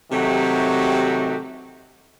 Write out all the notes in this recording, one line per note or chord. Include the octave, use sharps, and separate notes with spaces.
C3 D#3 F#3 A3 F#4 G4